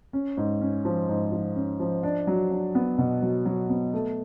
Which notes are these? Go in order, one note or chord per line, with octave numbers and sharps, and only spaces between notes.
C#4
G#2
C#4
F3
G#2
F3
C#4
F3
D4
F#3
D4
B3
B2
F#3
F#3
B3
A3